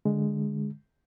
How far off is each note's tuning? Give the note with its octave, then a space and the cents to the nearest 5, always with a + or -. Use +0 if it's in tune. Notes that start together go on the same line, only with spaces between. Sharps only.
D3 +0 G#3 +0